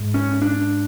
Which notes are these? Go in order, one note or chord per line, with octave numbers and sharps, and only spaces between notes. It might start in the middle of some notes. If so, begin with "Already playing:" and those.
Already playing: G#2
C#4
D4